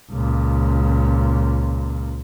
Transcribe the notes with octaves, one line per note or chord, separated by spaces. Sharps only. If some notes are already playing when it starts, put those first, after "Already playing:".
C#2 A#2